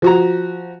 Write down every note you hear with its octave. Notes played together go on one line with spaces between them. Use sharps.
F3 F#4 A#5